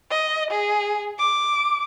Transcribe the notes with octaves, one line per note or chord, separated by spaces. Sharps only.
D#5
G#4
D6